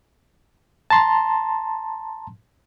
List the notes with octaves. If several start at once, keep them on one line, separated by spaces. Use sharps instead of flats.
A5 A#5 C6